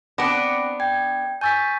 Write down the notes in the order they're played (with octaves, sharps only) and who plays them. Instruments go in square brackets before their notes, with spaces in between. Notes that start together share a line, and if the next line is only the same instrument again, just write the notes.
[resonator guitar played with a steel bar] B3 D4 [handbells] C4 A#6 D7 [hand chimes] F#5 B5 D6
[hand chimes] G5 [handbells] G#6
[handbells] G#5 C#6 E6 [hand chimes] G6 A6 B6